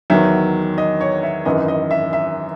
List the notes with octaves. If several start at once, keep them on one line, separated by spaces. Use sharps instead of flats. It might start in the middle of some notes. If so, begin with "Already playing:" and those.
E2 D#3 F#3 E5
D#5
C#5
E5
G#1 F#2 E3 D#5
D#5
E5
E5